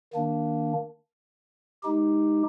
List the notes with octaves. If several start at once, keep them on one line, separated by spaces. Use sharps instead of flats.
D#3 A#3 D4
G#3 D#4 G4